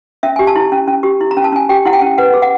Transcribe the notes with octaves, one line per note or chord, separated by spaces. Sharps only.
C#4 E5
G4 G#5
A5
E4
C#4
C#4
G4
E4
A#5
C#4
A5
C#4 G#5
G4 G5
E4 F#5
G5
C#4
B4 F#5
G#4
F#5